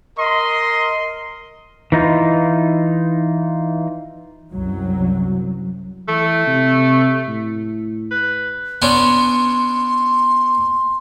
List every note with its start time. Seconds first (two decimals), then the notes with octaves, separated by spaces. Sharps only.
0.18 A#4 D#5 C6
1.92 E3 D#4 F4
4.52 C2 F#2 F#3
6.08 E3 A3
6.47 C3
7.28 A2
8.11 B4
8.82 B3 C#4 D4 C6